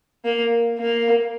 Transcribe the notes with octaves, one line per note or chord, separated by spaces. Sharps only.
A#3
A#3